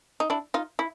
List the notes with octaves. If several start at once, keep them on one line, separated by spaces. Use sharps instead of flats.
D#4
D4 E4
D#4 F4
E4